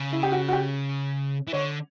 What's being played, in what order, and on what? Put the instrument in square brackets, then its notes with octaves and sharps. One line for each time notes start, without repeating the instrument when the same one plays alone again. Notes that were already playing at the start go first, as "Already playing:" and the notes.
Already playing: [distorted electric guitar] C#3
[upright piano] E4
G4
F#4
F#4
G4
[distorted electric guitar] E3
[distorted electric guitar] D3 [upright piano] C#5